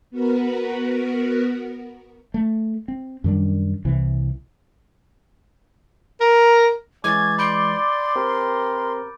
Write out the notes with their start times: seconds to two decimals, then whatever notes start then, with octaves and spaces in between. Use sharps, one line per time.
0.11 B3 F#4 A#4 B4
2.34 A3
2.88 C4
3.24 F#2 D#3 G3 D4
3.85 C2 C3 E3
6.20 A#4
7.04 E3 G#3 C#4 D6 G#6 A6
7.39 D5 B5 C6 G6 D7
8.16 C4 G4 A#4